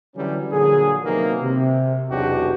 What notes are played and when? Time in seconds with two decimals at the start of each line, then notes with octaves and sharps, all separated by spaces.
0.16 D3 E3 F#3 G3 C#4
0.51 A#2 D3 F3 F#3 G#4
1.04 C3 D#3 F#3 A#3 B3 A#4
1.42 C3
2.10 B1 E2 D4 F#4 G4